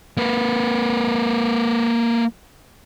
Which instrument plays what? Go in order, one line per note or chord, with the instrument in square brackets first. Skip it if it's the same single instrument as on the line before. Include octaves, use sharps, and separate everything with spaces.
[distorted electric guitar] A#3 B4